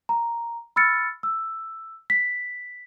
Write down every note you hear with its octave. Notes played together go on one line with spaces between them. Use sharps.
A#5
B5 E6 F6 A6 C#7
E6
B6